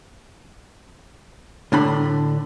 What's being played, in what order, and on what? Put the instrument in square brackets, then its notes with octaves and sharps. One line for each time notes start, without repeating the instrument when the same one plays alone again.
[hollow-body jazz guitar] A2 D3 D4 B5